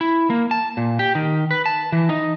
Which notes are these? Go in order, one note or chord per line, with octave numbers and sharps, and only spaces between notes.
E4
A#3
A5
A#2
G4
D#3
B4
A5
E3
D#4